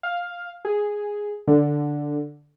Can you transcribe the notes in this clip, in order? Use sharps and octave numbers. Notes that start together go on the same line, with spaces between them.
F5
G#4
D3